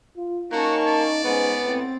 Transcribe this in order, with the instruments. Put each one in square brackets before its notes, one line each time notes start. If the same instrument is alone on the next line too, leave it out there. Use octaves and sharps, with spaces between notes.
[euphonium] F4
[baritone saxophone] A#3 [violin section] C#4 A5 C#6 [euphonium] D#4 [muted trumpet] F#4
[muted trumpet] D5
[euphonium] G#2 [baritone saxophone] B3 [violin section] C#4 B4
[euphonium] A2 [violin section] C4 A6